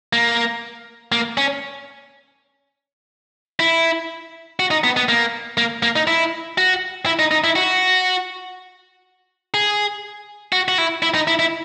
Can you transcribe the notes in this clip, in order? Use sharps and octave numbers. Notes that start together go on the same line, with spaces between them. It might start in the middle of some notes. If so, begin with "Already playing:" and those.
A#3
A#3
C#4
E4
F#4
D#4
B3
B3
A#3
A#3
A#3
D#4
E4
F#4
E4
D#4
D#4
E4
F#4
G#4
F#4
F#4
E4
E4
D#4
E4
E4